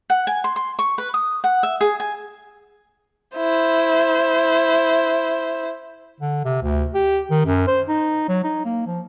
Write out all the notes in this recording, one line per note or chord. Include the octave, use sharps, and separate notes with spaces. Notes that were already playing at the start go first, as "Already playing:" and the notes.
F#5
G#5
C6
C6
C#6
B4
D#6
F#5
E5
G#4
G#5
E4 C5
D3
C3
D2
G4
D#3
F#2
C5
D#4
F#3
D#4
A#3
F3